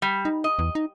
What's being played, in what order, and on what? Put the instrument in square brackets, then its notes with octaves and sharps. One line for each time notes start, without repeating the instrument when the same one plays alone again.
[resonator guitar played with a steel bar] G3
[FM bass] D#4
[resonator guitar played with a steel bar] D#5
[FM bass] E2
D#4